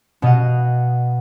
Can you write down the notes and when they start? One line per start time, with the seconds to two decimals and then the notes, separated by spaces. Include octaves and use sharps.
0.22 B2 B3 D#5 F5 F#5